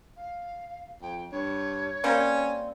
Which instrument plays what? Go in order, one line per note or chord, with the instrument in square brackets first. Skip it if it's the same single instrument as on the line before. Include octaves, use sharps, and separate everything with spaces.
[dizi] F5
[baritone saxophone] F2 [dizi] G5
[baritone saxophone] G2 [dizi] C#5
[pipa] G3 A#3 C4 [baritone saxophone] C#4